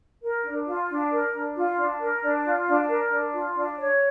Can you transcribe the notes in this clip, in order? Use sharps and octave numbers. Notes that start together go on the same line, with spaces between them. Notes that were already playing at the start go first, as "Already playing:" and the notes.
A#4
D4
F4
D4
A#4
D4
F4
D4
A#4
D4
F4
D4
A#4
D4
F4
D4
C#5